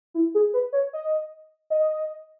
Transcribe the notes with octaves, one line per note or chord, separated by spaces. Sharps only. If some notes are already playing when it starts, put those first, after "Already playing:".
E4
G#4
B4
C#5
D#5
D#5